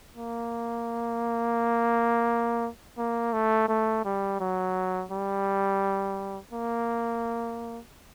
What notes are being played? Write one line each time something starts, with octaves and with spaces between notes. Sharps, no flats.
A#3
A#3
A3
A3
G3
F#3
G3
A#3